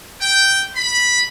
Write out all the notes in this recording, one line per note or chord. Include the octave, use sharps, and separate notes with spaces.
G5
B5